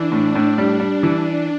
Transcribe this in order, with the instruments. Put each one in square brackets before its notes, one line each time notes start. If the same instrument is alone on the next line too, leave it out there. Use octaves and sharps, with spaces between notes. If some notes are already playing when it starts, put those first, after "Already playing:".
Already playing: [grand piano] E3 [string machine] D4
[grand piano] A2
A2
G3
G3
E3